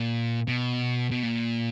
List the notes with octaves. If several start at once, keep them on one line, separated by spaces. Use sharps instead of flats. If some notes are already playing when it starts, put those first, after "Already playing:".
Already playing: A#2
B2
B2
A#2